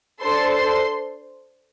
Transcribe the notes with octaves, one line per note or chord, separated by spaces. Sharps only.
D4 A4 C5 C6
C5 C6